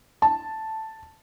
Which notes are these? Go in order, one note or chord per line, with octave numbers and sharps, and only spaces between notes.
A5